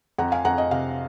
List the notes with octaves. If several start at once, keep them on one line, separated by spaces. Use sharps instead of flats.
F2 F#5 A#5
F5 G#5
F2 F#5 A#5
D#5
C3 F5